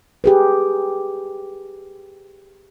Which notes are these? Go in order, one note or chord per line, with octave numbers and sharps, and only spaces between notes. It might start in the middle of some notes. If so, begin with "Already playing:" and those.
G4 G#4 B4